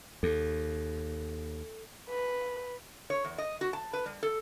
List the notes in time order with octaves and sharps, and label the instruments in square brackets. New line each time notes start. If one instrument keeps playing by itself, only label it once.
[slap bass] D#2 [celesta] A4
[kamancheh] B4
[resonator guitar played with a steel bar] C#5
E2
D#5
F#4
A5
B4
G3
A4